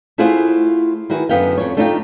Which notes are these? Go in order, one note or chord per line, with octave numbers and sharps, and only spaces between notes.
A3 E4 F4 G#4 C5 F#5
D#3 E4 F#4 G#4 B4
F#2 D3 G#3 B3 F5 G5
F2 C#5
A3 D4 D#4 F4 D#5 G5